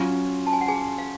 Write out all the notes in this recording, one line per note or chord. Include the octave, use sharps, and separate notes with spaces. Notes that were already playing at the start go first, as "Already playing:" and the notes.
Already playing: F#3 C#4 F4
A5
G#5
F#5
G#4 G#5
F5